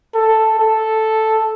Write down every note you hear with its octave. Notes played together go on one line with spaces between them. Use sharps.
A4
A4